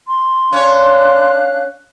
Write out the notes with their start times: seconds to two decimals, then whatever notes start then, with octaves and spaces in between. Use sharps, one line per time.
0.08 C6
0.53 C#4 D4 C#5 F5 F#6